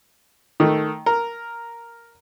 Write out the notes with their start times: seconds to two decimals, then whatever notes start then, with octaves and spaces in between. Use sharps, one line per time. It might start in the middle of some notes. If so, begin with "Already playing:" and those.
0.60 D#3 A3
1.06 A#4